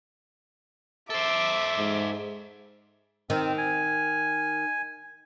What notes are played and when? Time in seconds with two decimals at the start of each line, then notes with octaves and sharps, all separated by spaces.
1.10 A4 C5 E5 D6
1.78 G#2
3.30 D#3 C4
3.58 G#5